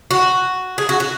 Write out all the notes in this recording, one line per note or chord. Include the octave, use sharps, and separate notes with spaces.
F#4
G#4
F#4
F#4